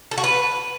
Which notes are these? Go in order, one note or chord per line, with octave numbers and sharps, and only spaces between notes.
A4
F#4
B4